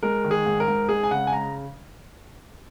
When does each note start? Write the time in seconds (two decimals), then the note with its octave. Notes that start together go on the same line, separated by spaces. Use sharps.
0.03 G#3 A#4
0.24 D#3
0.31 G#4
0.46 G#2
0.60 A#4
0.68 G#2
0.89 G#3 G#4
1.04 G#5
1.11 C#3 F#5
1.27 G#5
1.33 A#5